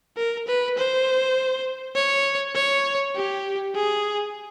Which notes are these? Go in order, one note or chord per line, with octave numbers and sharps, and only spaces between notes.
A#4
B4
C5
C#5
C#5
G4
G#4